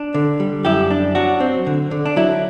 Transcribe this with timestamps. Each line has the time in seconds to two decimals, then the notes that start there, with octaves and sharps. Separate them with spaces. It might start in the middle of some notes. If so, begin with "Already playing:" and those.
Already playing: D4
0.14 D3
0.40 G3
0.65 F#2 E4 G4
0.91 D4
1.15 F#3 D4 F#4
1.40 C4
1.67 D3
1.91 D3
2.06 D4
2.16 F#3 E4